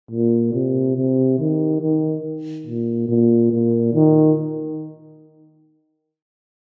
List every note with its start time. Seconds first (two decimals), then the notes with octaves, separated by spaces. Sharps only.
0.11 A#2
0.53 C3
0.97 C3
1.39 D#3
1.81 D#3
2.67 A#2
3.09 A#2
3.51 A#2
3.94 D#3